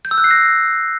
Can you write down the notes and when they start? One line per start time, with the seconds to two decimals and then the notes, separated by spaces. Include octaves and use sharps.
0.05 G6
0.11 E6
0.18 F#6
0.24 C7
0.31 A#6